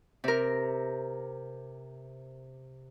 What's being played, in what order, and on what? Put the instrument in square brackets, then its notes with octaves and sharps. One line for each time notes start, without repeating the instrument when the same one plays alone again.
[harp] C3 A#4